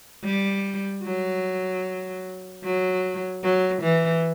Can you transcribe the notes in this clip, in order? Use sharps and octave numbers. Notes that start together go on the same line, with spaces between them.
G3
F#3
F#3
F#3
E3